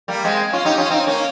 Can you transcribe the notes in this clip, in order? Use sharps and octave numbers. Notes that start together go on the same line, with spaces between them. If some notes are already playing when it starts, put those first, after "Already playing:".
G3 A#3
G#3 C4
C#4 F4
D#4 G4
C#4 F4
C4 D#4
A#3 C#4